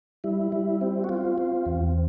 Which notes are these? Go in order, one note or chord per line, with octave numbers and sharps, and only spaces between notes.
G3 E4
G3
C4
F#4
C4 F4
C4
E2